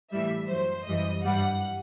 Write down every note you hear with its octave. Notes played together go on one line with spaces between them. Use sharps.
A2 E3 G3 E5
F#2 F#3 C5
F#2 E3 G3 D#5
G2 E3 G3 F#5